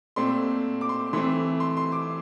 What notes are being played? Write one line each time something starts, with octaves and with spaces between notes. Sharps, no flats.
A#2 A3 C4 C6
D6
C6
E3 A3 C4 C6
C6
C6
D6